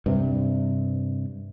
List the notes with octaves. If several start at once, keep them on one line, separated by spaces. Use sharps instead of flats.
G2 C3